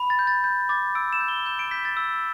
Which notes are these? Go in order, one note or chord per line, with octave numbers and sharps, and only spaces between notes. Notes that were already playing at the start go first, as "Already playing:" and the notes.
Already playing: B5
A6
G6
A6
G6
D6 A6
E6 D7
E7
G6
G7
G6 E7
D7
G6 B6
A6
E6